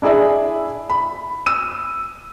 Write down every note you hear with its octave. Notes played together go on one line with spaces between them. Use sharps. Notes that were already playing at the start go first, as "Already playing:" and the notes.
D4 E4 G#4 D5 E5
B5
E6 D#7